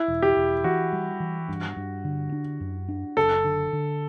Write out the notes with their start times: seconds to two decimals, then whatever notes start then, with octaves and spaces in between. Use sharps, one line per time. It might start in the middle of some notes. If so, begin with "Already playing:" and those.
Already playing: E4
0.08 E1
0.22 G4
0.36 E1
0.64 E3 F#4
0.93 G3
1.20 E3
1.48 G2
1.76 G2
2.04 D3
2.32 D4
2.60 F#2
2.89 D4
3.17 F#1 A4
3.44 D3
3.73 D3